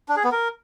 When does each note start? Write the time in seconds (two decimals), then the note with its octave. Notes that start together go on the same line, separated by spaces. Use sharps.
0.09 D4
0.16 G#4
0.24 B3
0.32 A#4